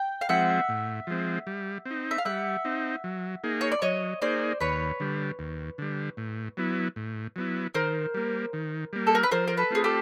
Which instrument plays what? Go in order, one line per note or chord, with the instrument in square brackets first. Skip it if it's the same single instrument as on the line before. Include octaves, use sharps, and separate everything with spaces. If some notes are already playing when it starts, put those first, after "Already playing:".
Already playing: [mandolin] G5
F5
[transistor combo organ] F3 G#3 C4 [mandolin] E5 F#5
[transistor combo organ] A2
F3 G#3 C4
G3
C4
D#4
[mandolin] E5
F5
[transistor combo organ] G3 [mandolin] E5 F#5
[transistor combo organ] C4 D#4
F#3
A#3 D#4 G#4
[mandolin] C#5
D5
[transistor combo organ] F#3 [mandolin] C#5 D#5
[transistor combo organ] A#3 D#4 G#4 [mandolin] C5 D5
[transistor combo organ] D#2 [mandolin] B4 C#5
[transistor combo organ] D3 G3
D#2
D3 G3
A2
F#3 B3 E4
A2
F#3 B3 E4
[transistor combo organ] D#3 [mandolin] A#4 C5
[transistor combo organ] G3 A#3
D#3
G3 A#3
[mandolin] A4
A#4
B4
[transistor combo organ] F3 [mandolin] A#4 C5
[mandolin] A#4
A4 B4
[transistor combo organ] A3 C4 F4 [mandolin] G#4
[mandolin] G4 A4